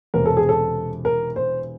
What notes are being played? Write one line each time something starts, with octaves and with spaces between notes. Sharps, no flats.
E1 E2 C3 A#4
A4
G#4
A4
A#4
C5